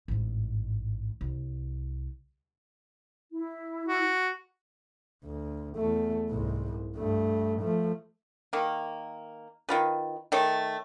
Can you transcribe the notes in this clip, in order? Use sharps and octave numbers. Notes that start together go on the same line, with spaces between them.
A1 G#2
C2
E4
F#4
D2
E2 A3
C2 G#2
G2 A3
F3 A3
D#3 A#3
D#3 F4 B4
D#3 A3 C#5